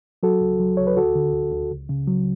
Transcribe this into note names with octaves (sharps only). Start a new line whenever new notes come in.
F#3 F#4 A4
C#2
F#3
C#2 C#5
B4
D2 F#4 A4
D3
D2
D2
C#2
C#3
F#3